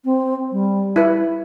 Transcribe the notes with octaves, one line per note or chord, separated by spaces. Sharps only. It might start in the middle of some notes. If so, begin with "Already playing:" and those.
C4
G3
E4 B4